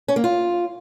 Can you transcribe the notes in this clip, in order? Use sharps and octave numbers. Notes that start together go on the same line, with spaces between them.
C#4
A#3
F4